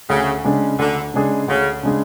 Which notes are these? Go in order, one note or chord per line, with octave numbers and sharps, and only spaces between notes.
D2 C#3
C#3 G#3 D4 G#4
D2 D3
C#3 G#3 D4 G#4
D2 C#3
C#3 G#3 D4 G#4